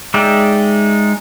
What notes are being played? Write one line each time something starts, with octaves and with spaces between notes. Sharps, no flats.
G#3 D#4 D5 E5 G5